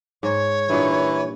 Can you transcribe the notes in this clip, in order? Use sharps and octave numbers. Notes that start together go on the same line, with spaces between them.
G#2 C#5
G2 A#2 E3 D#4